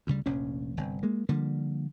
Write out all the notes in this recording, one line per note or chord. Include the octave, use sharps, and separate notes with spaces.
D2 C#3 G3
F1 A#1 C#4
G1 C3
G#3 A#3
D3 F3 G3 A#3